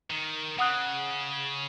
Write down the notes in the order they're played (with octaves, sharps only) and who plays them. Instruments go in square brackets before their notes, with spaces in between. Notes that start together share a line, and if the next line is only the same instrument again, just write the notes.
[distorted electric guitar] D#3
[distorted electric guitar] C#3 [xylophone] F#5 D#6 F#6